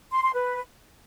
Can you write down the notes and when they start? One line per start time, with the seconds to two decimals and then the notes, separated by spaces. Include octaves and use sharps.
0.12 C6
0.22 C6
0.33 B4